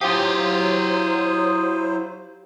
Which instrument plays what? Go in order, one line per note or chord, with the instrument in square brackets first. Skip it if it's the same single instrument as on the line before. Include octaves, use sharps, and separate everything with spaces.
[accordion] F#3 C5 [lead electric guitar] E4 F5 [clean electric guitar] F4 G4 [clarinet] D#6